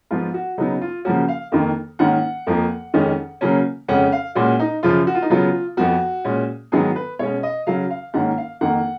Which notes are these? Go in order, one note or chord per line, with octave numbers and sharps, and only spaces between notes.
G#2 F3 B3 F4
F#4
C#3 F#3 B3 D#4
F4
C#3 F3 A#3 C#4 F#4
F5
F2 D#3 A#3
G#2 D#3 A#3 C#4 F#5
F2 F3 A#3
F2 D#3 G#3 C#4
C#3 F#3 A#3 C#4
F2 C#3 G#3 C#4 F#5
F5
A#2 G#3 C#4 F#4
D#4
F#2 C#3 F3 F4
F#4
F4
D#4
C#3 F#3 B3 F4
F2 F3 B3 F#4
A#2 G#3 C#4
G#2 D#3 F#3 B3 G#4
B4
B2 G#3 C#4 C#5
D#5
C#3 F#3 C#4 F5
F5
G#2 D#3 A#3 C#4 F#5
F5
F2 D#3 A#3 F#5